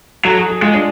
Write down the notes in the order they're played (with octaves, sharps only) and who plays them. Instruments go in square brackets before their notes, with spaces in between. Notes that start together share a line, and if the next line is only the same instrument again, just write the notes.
[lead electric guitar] F#3 [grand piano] A4
[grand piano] G#4
G#4
[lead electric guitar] G#3 [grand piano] F4
[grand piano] D4